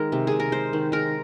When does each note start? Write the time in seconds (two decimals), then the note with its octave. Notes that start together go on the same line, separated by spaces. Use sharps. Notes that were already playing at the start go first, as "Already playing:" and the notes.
Already playing: D#3 G#3 A#3 A#4
0.12 C3
0.27 C3 G#4
0.40 A#4
0.52 G#3 C5
0.73 D#3
0.92 G#3 A#4